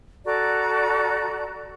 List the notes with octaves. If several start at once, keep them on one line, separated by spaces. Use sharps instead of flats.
F#4 A4 D5 A#5